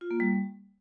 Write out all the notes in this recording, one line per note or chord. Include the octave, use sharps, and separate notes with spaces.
F4
A#3
G3